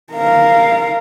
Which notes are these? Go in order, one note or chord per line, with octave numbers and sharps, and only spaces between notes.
A#4 F5